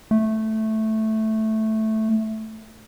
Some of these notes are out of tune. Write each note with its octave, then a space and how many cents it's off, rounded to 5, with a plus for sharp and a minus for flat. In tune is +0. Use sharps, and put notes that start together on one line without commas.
A3 -5